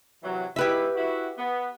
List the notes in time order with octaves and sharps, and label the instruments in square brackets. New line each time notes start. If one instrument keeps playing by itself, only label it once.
[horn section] C3 E3 F#3
[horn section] G#2 B2 E4 [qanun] G4 B4 E5
[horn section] E4 F#4
B3